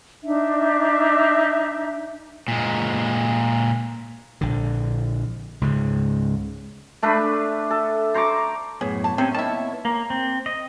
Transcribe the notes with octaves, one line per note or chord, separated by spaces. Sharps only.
D4 D#4 E5
A#2 G#3
A#1 D3
C#2 G#2 C#3
A3 D4 B4 B5
A4
C5 A#5 C#6 D6
F#2 A2 B3 G#4 C#5
A5
C3 C4 C#4
D#3 A#3 E4 A5
A#3
C4
D#5